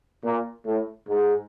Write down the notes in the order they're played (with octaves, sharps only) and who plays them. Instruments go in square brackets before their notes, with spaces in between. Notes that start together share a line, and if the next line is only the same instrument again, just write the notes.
[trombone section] A#2
A2
G#2